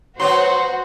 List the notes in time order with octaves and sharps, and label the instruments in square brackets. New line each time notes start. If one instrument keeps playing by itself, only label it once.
[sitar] F#3 B3 C#5 [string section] F#4 [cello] C5 [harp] C6